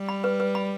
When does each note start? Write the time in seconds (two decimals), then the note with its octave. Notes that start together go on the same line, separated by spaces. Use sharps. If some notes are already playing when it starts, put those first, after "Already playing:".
Already playing: G3
0.09 B5
0.24 B4
0.40 B4
0.55 B5